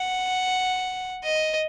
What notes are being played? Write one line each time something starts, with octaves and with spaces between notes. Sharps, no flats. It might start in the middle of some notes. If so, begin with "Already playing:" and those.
Already playing: F#5
D#5